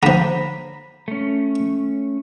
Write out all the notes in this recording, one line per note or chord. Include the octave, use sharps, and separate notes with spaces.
D3 F3 A#5 B5
A3 C#4